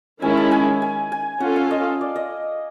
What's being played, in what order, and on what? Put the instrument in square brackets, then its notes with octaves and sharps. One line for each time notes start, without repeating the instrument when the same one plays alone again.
[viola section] D#3 G#3 C#4 E4 [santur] G#5
[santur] A5
G#5
G#5
G#5
[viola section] C#4 F4 A4 [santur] F#5
[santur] F5
D#5
D5
D#5